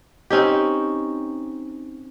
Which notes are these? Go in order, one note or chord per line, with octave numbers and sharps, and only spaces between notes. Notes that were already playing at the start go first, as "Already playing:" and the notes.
C4 C#4 D#4 G4